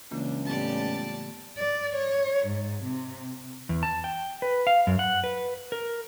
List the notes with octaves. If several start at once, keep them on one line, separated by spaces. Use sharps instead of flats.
C#2 C#3 E3 A#3 D4
A2 G3 B3 G4 D5 A5
D5
C#5
G#2
C3
E2
A5
G5
B4
F5
F#2
F#5
B4
A#4